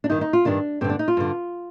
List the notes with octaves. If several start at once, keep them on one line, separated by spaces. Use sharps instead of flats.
D4
G2 D#3 D#4
D#4
F4
G2 D#3 D4
G2 D3 C4
D4
D#4
F4
G2 D3